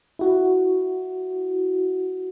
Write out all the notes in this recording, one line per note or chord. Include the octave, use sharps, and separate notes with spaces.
E4 F#4